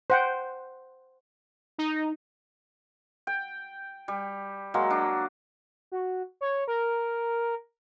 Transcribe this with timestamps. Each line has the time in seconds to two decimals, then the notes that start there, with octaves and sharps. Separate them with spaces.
0.10 C5 F#5 G5
1.78 D#4
3.27 G5
4.08 G3
4.74 F#3 G#3 A#3
4.90 D4
5.92 F#4
6.41 C#5
6.68 A#4